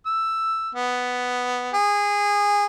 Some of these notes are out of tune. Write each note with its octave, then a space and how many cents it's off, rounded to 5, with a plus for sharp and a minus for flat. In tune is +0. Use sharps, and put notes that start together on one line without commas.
E6 +5
B3 +5
G#4 -20